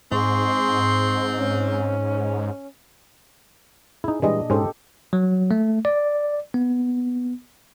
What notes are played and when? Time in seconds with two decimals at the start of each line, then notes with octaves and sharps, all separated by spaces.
0.12 G#2 C4 G#4 C6 C#6
1.38 C#4
4.04 D#4 E4 G#4
4.22 A#2 E3 G3 G#3 D4 D#5
4.50 G#2 C#4 G4 A4 C5
5.13 F#3
5.51 A3
5.85 D5
6.54 B3